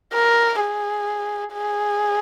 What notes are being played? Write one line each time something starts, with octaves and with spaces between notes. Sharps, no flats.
A#4
G#4
G#4